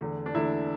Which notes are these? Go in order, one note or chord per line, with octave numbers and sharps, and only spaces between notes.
E2 D3 A3
D4
E2 D3 A3 E4